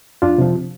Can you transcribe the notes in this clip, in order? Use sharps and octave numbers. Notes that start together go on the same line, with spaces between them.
F2 D4 F4
C3 F3